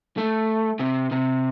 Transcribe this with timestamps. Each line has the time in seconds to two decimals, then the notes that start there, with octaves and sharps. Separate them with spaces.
0.18 A3
0.79 C3
1.11 C3